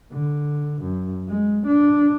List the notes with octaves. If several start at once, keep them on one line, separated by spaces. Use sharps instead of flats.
D3
F#2
G#3
D4